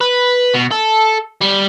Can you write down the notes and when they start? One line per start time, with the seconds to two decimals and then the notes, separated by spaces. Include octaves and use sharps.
0.01 B4
0.54 B2
0.71 A4
1.42 G3